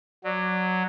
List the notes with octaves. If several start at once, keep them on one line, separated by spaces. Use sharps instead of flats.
F#3 D5